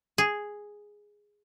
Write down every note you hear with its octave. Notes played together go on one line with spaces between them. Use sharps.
G#4